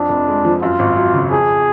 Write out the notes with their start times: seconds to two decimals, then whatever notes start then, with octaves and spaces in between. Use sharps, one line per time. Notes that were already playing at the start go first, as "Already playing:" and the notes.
Already playing: F2 D4
0.09 F1
0.28 G#3
0.45 F3
0.62 F#2 F4
0.79 G#1
0.96 F#3
1.14 C#3
1.31 F2 G#4